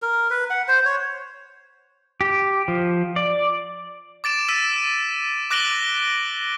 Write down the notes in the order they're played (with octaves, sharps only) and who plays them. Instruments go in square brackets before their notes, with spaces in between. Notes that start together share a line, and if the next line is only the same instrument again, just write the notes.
[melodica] A#4
B4
F#5
C5
C#5
[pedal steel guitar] G4
F3
D5
[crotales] D6 A6 D7 E7
E6 B6 D#7
D6 F#6 A#6 D7 F#7 G7